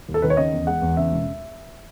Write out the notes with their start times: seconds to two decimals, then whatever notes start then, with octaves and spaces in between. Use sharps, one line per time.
0.09 D#2
0.14 A4
0.22 D#3 B4
0.30 C#5
0.37 C#3 D#5
0.53 E2
0.67 G#3 F#5
0.82 E2
0.97 C#3 E5
1.12 E1